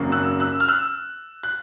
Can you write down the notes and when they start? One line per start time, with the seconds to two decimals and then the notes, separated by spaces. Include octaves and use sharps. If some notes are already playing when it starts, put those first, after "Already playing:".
Already playing: G#1 F#2 C#3 F#3 A#3
0.12 E6 F#6
0.40 E6 F#6
0.60 F6
0.68 E6 F#6
1.43 F#6